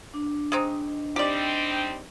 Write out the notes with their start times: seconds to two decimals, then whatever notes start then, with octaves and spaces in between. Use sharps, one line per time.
0.14 D4
0.52 G#3 C4 D#4
1.16 G3 C4 D#4 G4 D5